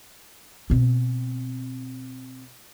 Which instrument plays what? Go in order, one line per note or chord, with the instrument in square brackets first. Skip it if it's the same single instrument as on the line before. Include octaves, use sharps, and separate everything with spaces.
[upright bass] B2 C4